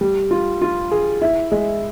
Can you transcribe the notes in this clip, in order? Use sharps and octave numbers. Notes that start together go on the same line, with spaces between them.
G3
F4
F4
G#4
E4
G#3